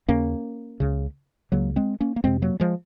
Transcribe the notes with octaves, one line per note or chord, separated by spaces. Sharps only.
D#2 C#3 A#3 C#4
C#2 C#3
C#2 C#3 F#3 A#3
G#3 C4
A#3 C#4
A#3
F2 C3 G#3 C4
F#3 A#3
F3 G#3